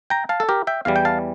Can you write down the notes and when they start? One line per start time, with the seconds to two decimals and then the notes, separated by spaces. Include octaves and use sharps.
0.10 G5 A#5
0.29 F5 A5
0.40 A4
0.49 G4 A#4
0.67 E5 G5
0.85 E2 E3 G3 F5
0.96 G5
1.05 F5 A5